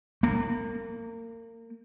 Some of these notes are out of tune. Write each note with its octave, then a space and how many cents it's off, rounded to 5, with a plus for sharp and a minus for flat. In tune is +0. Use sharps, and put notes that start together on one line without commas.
A#3 -30